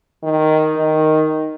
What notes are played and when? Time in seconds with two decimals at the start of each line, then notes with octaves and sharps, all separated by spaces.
0.24 D#3
0.77 D#3